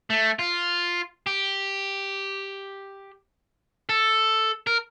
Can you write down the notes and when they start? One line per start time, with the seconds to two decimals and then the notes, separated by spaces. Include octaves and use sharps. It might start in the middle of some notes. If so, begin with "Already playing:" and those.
0.10 A3
0.39 F4
1.27 G4
3.89 A4
4.67 A#4